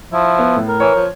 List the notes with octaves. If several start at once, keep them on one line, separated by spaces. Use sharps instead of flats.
F3 E4
B3
A2
A#4
E3 C#5
F3